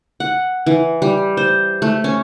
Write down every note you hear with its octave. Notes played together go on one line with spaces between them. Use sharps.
F#5
E3
G3
C5
A3
C#4